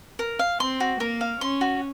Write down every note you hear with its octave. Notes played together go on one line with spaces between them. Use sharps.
A#4
F5
C4 C6
F#4
A#3 A#4
F5
C#4 C6
F#4